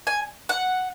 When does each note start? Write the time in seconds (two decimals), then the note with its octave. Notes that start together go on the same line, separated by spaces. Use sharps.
0.07 G#5
0.49 F#5